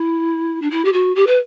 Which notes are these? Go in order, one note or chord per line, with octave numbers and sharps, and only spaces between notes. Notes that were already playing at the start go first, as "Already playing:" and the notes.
Already playing: E4
D4
E4
G4
F#4
G4
B4